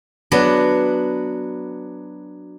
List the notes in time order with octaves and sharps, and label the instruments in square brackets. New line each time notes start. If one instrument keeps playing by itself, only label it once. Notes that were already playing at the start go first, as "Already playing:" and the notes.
[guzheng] F#3 B3 D4